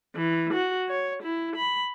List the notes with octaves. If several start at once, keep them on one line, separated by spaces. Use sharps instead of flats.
E3
F#4
C#5
E4
B5